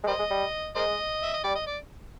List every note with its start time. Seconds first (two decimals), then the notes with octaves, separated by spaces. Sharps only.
0.04 G#3
0.07 G3 A#4 C5 D#5
0.19 G#3
0.31 G3
0.76 G#3 A#4 C5 D#5
1.23 E5
1.34 D#5
1.44 G3 D5
1.55 D#5
1.67 D5